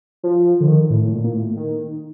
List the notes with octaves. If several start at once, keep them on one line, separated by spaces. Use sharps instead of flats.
F3
D3
D#3
A2
A2
A#2
A#2
A2
D#3